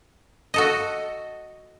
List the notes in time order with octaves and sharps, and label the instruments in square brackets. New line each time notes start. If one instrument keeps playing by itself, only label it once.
[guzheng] F#4 A4 D#5